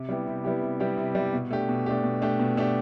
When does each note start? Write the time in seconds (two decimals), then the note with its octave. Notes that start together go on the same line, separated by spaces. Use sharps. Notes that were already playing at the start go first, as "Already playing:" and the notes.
Already playing: C3
0.09 G3 B3 E4 G4
0.27 C3
0.44 G3 B3 E4 G4
0.62 C3
0.80 G3 B3 E4 G4
0.97 C3
1.15 G3 B3 E4 G4
1.33 B2
1.50 A3 D4 G4
1.69 B2
1.86 A3 D4 G4
2.04 B2
2.22 A3 D4 G4
2.40 B2
2.57 A3 D4 G4